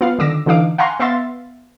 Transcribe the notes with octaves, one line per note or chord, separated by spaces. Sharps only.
B3 F4 F5
D3 D#3 D6 E6 A#6
D3 E3 D#4 F5 D6
F5 F#5 G#5 A#5 C6 C#6
B3 E5 F5 C6 A6